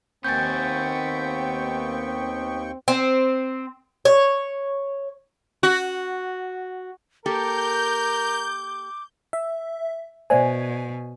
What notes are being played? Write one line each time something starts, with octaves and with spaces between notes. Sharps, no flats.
D#2 B3 C4 G5 G#5 C#6 G6 A6
C4
C#5
F#4
A#3 G4 A4 A#4 D6 G6
E5
B2 C5 D5 E5 G#5